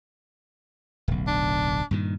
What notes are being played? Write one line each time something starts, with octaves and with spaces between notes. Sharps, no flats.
D1 B1
D4
G2 A#2 D#3